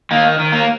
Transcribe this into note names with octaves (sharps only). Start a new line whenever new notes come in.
D#3 A#3
D#3
A#3